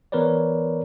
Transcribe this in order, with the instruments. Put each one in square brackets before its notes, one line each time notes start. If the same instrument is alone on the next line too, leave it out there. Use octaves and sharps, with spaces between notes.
[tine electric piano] E3 B3 A#4 B4 C#5 D5